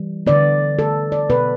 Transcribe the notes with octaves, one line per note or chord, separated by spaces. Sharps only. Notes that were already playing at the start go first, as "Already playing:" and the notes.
Already playing: E3 G3
D3 B3 D5
A4
D5
B2 B3 B4